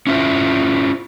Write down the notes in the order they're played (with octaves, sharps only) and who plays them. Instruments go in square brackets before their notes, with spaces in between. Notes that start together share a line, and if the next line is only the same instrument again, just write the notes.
[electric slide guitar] C#4 E4 F4 C5